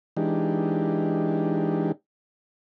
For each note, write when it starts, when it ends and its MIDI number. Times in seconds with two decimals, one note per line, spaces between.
0.17 1.92 52
0.17 1.92 56
0.17 1.92 62
0.17 1.92 63
0.17 1.92 67